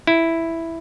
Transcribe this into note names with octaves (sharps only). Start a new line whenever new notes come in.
E4